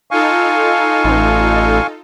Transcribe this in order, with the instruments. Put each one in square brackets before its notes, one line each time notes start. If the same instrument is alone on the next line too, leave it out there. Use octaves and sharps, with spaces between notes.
[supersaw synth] D#4 F4 A4 [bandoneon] F5 G#5 C#6
[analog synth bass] A1